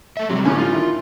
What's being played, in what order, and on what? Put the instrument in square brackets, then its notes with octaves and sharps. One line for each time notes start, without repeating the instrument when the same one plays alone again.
[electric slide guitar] A3 E5
[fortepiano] C3 [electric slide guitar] F#3 G3
[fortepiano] A1 A2 D3 [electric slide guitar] C#4 G#5
[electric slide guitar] F4
[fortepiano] D#3 E4